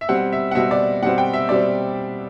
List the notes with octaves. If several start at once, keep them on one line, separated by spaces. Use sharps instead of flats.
E5
B2 G3 C4 F#5
E5
F#5
B2 G3 C4 E5
D5
B2 G3 C4 F#5
G5
E5
B2 G3 C4 D5